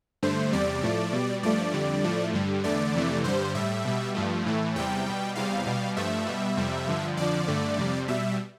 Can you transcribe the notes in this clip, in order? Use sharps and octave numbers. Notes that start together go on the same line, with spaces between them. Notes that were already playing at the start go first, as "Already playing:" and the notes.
G2 D3 A3 C5
E2 C3 G3 D5
A2 F3 A3
B2 G3
G2 F3 A3 D5
F2 D3 G3
A2 F3 A3
G2 D3 G3
E2 D3 A3 D5
F2 C3 E3 A3
G2 D3 G3 C5
A2 G3 E5
B2 G3
G2 F3 A3
A2 E3 A3
E2 C3 G3 G5
B2 G3
E2 C3 G3 F5
B2 G3
G2 F3 A3 E5
B2 G3
F2 C3 G3
G2 D3 F3
F2 D3 F3 D5
G2 D3 A3
F2 C3 G3
B2 G3 E5